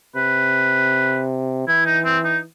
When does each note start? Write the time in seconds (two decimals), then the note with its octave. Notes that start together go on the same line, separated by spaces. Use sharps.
0.16 C3 B4
1.67 E3 E4
1.86 D#4
2.05 C4
2.24 D#4